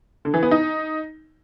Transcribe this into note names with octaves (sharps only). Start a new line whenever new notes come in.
D3
E3
B3
D#4